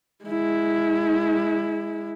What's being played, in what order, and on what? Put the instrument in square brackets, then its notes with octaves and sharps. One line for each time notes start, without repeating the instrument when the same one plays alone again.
[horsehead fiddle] G#3 E4